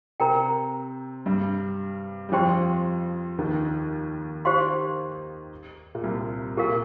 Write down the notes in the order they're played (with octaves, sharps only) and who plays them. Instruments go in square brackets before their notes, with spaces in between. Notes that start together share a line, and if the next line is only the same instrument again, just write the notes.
[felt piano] C3 C4 [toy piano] A#4 G5 A#5
[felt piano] G2 G3
G3
[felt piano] F2 F3 [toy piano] G4 C5 G5 C6
[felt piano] D#2 D#3
[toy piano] G4 C5 F5 C6
[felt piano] A#2
C2 C3
[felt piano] A#2 [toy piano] G4 A#4 F5